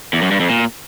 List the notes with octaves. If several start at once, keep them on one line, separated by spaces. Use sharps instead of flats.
E2
F#2
G2
F2
A#2